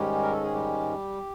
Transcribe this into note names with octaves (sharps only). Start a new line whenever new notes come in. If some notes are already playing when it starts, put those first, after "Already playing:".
Already playing: G#2 D#3 G3 G#3 C#4 G4
A#4
A4
G#4
G3 G4